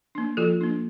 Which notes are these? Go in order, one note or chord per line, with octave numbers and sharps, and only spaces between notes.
A#3 D4
F3 F4 A4
A#3 D4